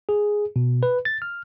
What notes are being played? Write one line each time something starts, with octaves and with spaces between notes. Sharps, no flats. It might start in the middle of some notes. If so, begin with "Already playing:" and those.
G#4
B2
B4
A6
F6